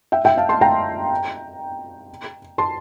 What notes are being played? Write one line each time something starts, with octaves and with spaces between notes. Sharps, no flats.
E5 G5
E5 G5
F5 A5
A5 C6
G5 A#5
A5 C6